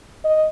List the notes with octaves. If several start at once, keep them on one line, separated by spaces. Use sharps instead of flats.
D#5